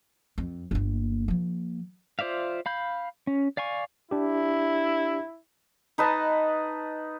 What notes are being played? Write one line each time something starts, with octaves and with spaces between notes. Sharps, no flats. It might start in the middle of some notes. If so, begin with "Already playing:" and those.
F2
G1 A#3
F3 A#3
F4 C5 D5 E5 F5
F5 B5 G6
C#4
D5 F5 G#5 C#6
D4 E4 G4
D#4 B4 D#5 A5